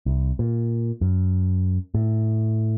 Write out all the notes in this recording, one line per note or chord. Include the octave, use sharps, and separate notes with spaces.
C2
A#2
F#2
A2